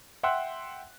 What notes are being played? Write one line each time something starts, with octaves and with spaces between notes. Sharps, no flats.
E5 F#5 G5 C6 E6 F#6